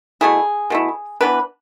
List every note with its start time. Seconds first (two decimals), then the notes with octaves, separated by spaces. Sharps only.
0.21 B2 A3 E4 G#4
0.70 B2 A3 E4
1.21 E3 B3 D4 B4